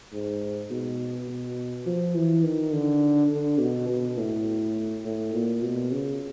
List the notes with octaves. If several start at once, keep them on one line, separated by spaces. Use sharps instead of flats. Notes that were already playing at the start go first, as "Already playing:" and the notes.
G#2
B2
B2
F3
E3
D#3
D3
D3
B2
B2
A2
A2
A#2
B2
C#3